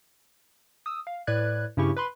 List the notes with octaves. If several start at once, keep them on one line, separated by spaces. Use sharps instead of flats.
D#6 E6
F5
A2 B4 D5 F#6 G#6
G2 C#3 C#4 E4 G4 C#6
B4 B5 C6